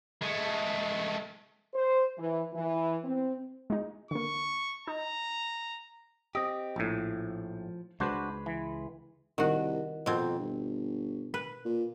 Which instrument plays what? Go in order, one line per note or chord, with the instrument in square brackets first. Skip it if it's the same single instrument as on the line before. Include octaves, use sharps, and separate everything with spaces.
[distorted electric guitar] G#3 A3
[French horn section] C5
E3
E3
C4
[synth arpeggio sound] G#3 D#4
[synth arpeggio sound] D3 A#3 [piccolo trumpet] C#6
[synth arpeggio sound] D#4 [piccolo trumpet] A#5
[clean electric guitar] C4 G4 [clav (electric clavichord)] D#5
[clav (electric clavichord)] A#1 A2 [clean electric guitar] F3
[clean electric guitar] C#2 G#3 B4 [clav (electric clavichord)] D4 F#4 C5
[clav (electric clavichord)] E3
[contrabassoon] C2 [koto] D#3 F#4
[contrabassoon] F2 [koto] B2 C4
[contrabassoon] G1
[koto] B4
[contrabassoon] A#2